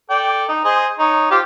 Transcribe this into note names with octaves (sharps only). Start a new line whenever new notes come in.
A4 D5 G5
D#4
G#4 C5 D#5
D#4 C#5
F4 G4 C5